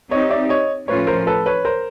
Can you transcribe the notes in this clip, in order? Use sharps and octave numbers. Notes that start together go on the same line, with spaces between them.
C4 D#4 G4 C#5 D#5
D5 E5
C#5 D#5
A2 F3 A3 C#4 F4 B4 C#5
A#4 C5
A4 B4
B4 C#5
A#4 C5